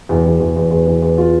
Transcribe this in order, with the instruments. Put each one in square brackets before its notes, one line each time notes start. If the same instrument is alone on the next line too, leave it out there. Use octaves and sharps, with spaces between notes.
[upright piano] E2
E2
E2
E2
E2
E2
E2
F4